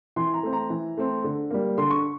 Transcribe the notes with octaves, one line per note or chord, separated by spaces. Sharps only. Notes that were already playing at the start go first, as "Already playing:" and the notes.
E3 C6
A#5
A3 C4
A#5
E3
A3 C4
D3
G3 A#3
D3 C6
C#6